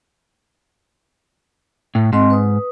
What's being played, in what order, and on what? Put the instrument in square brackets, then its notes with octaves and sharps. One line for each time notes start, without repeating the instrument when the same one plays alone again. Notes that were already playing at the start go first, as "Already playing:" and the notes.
[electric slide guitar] A2
[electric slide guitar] G#2 [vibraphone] C4 D#5 C6
[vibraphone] B4 D#6